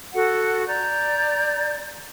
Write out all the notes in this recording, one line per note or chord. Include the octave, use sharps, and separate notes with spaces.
F#4 A4 F#5
D5 A#5 G6